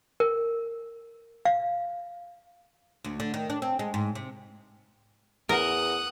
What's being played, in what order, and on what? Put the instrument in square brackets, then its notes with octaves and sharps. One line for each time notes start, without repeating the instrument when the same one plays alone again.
[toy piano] A#4
F5
[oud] D2
D3
D#3
D4
C4
G#3
G#2
C3
[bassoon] E2 [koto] A#4 [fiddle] F#5 D#6